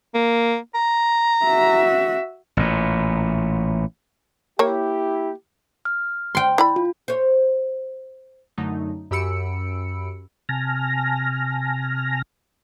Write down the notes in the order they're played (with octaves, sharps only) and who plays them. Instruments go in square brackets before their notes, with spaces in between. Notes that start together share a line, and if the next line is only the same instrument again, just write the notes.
[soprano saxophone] A#3
A#5
[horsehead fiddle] F#4 E5
[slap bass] A1 A#2
[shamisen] A#3 C#5 [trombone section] E4 G4
[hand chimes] F6
[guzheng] G5 C6
[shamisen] E4 D5 B5
[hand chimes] F4
[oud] C5 C#5
[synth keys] F#2 D3 F#3 A3 D#4
F#2 G4 B5 E6 C#7 D7
[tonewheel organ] C3 G#5 A5 F6 A#6